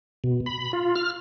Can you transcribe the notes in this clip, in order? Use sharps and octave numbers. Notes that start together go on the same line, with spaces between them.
B2
B5
F4
F6